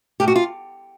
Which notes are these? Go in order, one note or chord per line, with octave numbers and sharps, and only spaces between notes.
A2 G4
F#4
F4